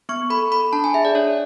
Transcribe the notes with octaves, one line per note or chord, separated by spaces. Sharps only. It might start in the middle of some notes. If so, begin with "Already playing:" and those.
B3 C#6
A4 B5
A4 B5
D4 A5
G#5
G#4 E5
D5
D4 C#5